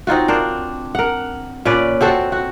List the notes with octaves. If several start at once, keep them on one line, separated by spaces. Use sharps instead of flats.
C4 D#4 F4 F#4
D4 A#4 C5
A#4 F#5
A#2 C#4 B4 D5
C4 F#4 A4 C5
F#4